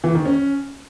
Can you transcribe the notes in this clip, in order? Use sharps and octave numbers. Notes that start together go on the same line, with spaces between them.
E3
D#3
C#4